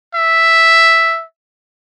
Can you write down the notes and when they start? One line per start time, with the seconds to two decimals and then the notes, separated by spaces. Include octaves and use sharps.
0.15 E5